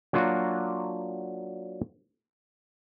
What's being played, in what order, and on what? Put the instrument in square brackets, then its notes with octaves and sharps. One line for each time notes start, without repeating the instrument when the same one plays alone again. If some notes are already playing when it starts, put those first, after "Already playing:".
[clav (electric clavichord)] F#3 A#3 D4 F4 F#4